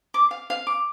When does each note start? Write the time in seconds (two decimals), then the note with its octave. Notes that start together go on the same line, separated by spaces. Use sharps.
0.14 D6
0.31 F5
0.50 F5
0.67 D6